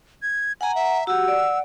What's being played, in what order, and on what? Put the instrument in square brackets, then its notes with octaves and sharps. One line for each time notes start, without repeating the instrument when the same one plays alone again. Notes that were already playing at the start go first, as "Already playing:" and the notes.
[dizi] G#6
[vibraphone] F#5 A#5 [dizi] G#5
[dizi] E5
[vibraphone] F#4 G4 [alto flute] F#5 [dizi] E6
[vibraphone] D5